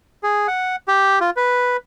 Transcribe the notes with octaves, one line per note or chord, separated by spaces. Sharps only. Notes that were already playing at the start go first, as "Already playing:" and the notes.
G#4
F#5
G4
F4
B4